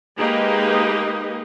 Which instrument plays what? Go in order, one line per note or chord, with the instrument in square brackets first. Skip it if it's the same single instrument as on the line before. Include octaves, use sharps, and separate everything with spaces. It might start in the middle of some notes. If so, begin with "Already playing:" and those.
[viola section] G#3 A#3 D#4 G4 B4 D#5